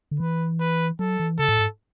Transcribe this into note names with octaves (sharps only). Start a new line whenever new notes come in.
D3
E3 B4
B4
F#3 A4
E3
C#3 A4
A2
G#2